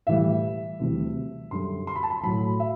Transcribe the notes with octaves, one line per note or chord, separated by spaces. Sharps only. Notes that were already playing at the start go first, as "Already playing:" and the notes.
A2 E3 G3 E5
D2 C3 E3 G3
F#2 D3 G3 C6
C6
B5
A5
B5
A2 F#3 B5
E5